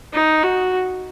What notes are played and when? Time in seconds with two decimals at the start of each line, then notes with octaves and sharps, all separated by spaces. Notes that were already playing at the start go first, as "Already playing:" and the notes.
0.13 D#4
0.43 F#4